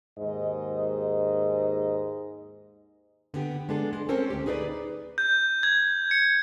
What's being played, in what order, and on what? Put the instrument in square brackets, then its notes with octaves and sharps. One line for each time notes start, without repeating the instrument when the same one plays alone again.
[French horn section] D#2 G#2 D#5
[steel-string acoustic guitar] D3 B3 G4
G#3 B3 D4 A4
G#3
C4 C#4 A4 A#4 C5
D2 G4
D#4 G#4 B4 C#5 D5
[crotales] G6
G#6
C#7